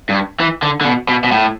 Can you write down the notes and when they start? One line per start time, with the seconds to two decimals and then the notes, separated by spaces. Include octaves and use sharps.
0.10 G2
0.40 E3
0.63 D3
0.81 D3
0.85 B2
1.09 B2
1.24 B2
1.32 A2